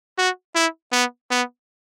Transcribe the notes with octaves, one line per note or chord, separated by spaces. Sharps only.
F#4
E4
B3
B3